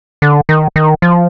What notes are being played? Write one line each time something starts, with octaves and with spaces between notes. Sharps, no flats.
D3
D#3
D#3
F3